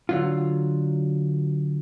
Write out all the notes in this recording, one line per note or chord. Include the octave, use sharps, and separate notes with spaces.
D3 F#3 F4